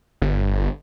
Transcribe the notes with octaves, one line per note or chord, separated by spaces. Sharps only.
G1